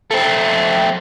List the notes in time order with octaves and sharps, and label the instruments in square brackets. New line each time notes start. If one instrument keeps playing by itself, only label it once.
[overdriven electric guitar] A3 C4